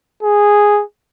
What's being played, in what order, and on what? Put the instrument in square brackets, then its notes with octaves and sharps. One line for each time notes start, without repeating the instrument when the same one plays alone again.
[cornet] G#4